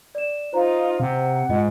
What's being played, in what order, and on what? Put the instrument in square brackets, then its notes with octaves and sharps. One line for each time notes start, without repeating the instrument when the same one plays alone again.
[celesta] D5 E7
[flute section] D#4 F4 [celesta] C5 A#5
[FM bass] C3 [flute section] F#5
[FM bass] G#2 [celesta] F4 D#5